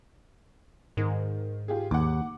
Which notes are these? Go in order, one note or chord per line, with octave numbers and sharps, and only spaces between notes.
G#2 D#3
F4 G4 G#4
D#2 F#5 D6